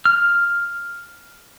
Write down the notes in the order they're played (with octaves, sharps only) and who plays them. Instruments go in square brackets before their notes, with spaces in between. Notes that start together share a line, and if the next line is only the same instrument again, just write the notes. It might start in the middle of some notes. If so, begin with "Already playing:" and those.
[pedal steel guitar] F6